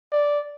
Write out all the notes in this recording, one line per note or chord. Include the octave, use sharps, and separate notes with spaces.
D5